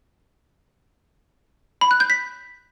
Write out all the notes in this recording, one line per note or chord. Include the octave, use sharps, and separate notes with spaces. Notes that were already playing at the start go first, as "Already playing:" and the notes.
B5
F#6
G6
B6